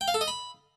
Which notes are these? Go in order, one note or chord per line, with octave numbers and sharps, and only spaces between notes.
G5
F5
A4
D#5
B5